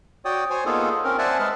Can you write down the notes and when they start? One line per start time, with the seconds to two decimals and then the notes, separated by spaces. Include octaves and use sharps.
0.25 F#4 C#5 D5 G5 D#6
0.50 C5 C#5 G#5
0.65 A#3 B3 D#4 F4 G#4 A4
1.04 C4 C#4 A#4
1.19 C5 D5 E5 F#5 G#5 A5
1.39 G#3 G#4 B4 A5 F6